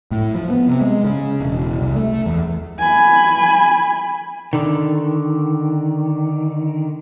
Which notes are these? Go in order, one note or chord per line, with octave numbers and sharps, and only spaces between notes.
A2
F3
B3
C3
G#3
C#3
E1
C2
A3
E2
G#5 B5
D3 D#3